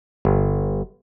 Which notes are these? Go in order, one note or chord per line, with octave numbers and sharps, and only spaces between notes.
G1